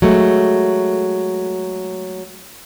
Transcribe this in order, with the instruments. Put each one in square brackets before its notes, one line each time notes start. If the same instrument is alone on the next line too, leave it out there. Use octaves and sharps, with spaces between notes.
[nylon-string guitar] F#3 G#3 A3